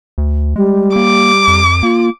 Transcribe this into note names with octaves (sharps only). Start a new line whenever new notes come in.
D2
G3 G#3
A#3 D6
F2
A#3 F4